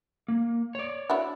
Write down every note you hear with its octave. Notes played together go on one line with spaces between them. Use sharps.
A#3
C#5 D5
D4 E4 F#4